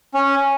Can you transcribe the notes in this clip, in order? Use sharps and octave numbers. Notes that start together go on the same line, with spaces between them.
C#4